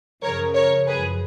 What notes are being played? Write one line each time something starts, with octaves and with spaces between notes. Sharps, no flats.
F#2 C#3 F3 A#4 C#5
A#4 C#5
F#2 F3 G#4 B4